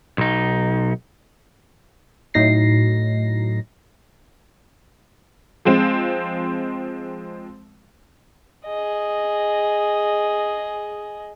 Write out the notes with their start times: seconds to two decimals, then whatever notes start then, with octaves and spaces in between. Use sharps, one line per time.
0.18 B1 D#4
2.34 A2 F#3 D#4 A#6 C7
5.65 F3 G#3 C4
8.66 G#4 D#5